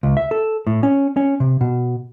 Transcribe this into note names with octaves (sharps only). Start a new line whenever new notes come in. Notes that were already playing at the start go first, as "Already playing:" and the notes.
C#2
E5
A4
A2
C#4
C#4
C3
B2